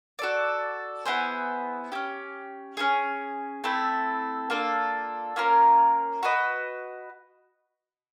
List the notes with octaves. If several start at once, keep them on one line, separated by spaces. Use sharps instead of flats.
F#4 A4 D5
B3 E4 G#4 C5
C#4 E4 G4
C#4 E4 G#4
A3 C4 E4 A4
A#3 D4 F4 A4
A#3 C#4 F4 A#4
F#4 B4 D#5